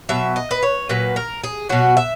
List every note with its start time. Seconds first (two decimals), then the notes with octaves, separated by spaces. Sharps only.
0.09 B2 F#3 E5
0.36 D#5
0.51 B4
0.63 C#5
0.89 A#2 F#3 B4
1.16 A#4
1.44 G#4
1.69 B2 F#3 F#4
1.97 E5